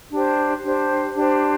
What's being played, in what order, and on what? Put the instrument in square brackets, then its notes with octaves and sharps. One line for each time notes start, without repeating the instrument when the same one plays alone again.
[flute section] D4 G4 C5
D4 G4 C5
D4 G4 C5